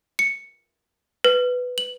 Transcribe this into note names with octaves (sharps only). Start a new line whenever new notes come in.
C#7
B4
F#7